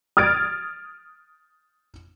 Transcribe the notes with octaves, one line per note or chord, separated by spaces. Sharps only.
D#6 F6 G#6 A6 D7